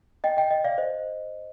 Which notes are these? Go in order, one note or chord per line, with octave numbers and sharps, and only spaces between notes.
D#5 G5
D#5 G5
D#5 G5
D5 F5
C5 D#5